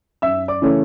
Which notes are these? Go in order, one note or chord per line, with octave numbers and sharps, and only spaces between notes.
F#2 E5 E6
D5 D6
C#3 E3 A3 C#4